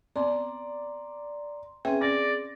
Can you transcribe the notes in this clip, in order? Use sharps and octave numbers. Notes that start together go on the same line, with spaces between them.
B3 C4 D5 A#5 C6
C4 C#4 G#4 B4 E5 G5
C#4 D5 A#6